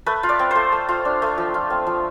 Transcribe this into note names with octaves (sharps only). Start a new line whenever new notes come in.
A3 B4
F4
D5
C4
A3 C5
A3
F4
D4
A3
F3
F4
C4
F3